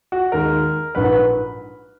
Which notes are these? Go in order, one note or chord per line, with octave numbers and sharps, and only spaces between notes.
F#4
D#2 D#3 G#3 A#4
A#1 G#2 F#3 B4